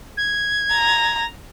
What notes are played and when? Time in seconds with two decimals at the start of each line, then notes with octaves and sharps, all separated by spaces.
0.17 G#6
0.73 A#5